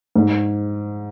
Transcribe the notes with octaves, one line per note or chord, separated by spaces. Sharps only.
G#2